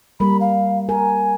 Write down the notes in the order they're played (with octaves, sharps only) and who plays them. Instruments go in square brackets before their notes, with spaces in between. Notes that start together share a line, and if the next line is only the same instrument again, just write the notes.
[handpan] G3 A#3 A#4 [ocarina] B5
[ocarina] F5
[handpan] A#4 [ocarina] G#5